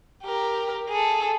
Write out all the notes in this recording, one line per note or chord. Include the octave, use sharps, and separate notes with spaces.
G4 A#4
G#4 A4